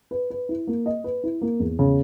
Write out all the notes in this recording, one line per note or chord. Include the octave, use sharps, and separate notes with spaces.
B4
B4
E4
A#3
D#5
B4
E4
A#3
E2
C#3